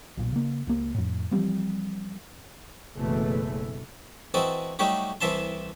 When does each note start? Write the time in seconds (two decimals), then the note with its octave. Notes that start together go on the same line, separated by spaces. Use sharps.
0.17 B1 A#2
0.32 C#3 A#3
0.67 C#2 A#3
0.94 F2 A2
1.31 E3 F3 G3 C4
2.97 F#1 B2 E3 A3
4.34 E3 C4 F#4 A4 D#5
4.79 F#3 G3 A3 D#4 F#4 G4
5.21 C2 E3 E5 A5 C6